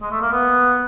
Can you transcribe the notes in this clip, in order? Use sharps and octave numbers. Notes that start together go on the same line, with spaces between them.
G#3
A3
A#3
B3